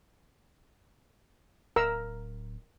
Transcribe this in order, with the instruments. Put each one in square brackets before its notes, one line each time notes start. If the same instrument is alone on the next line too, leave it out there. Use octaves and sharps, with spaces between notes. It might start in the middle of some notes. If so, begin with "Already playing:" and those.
[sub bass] D1 [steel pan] A#4 A#5 E6